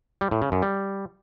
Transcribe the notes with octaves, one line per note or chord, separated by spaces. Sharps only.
G3
A2
C#3
F#2
G3